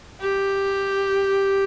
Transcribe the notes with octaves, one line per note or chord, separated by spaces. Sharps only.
G4